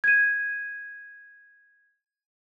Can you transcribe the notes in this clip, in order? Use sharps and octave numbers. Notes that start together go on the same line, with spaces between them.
G#6 D#7